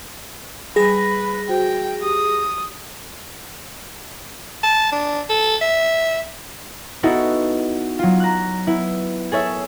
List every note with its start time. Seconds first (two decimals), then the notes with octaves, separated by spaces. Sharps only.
0.76 G3 G#4 B4 A#6
1.49 F#4 C5 G5
2.02 G4 D#6
4.63 A5
4.92 D4
5.29 A4
5.61 E5
7.03 B3 D#4 E4 F#4 A4
7.99 F#3 F4
8.20 A#5 F#6
8.67 B3 E4
9.32 G#4 A4 C#5 E5